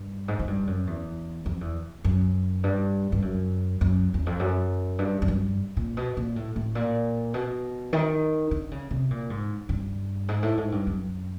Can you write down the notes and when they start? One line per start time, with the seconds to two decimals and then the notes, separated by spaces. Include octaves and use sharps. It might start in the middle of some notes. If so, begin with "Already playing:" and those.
Already playing: G2
0.28 G#2
0.39 G#2
0.47 G2
0.67 F#2
0.87 E2
1.46 F2
1.61 E2
2.04 F#2
2.64 G2
3.12 G2
3.22 F#2
3.81 F#2
4.14 E2
4.26 F2
4.39 F#2
4.99 G2
5.22 F#2
5.28 G2
5.77 A#2
5.97 B2
6.17 A#2
6.36 A2
6.56 A2
6.75 A#2
7.34 B2
7.93 D#3
8.51 D3
8.71 C#3
8.91 C3
9.11 A#2
9.30 G#2
9.69 G2
10.28 G#2
10.43 A2
10.57 G#2
10.72 G2
10.87 F#2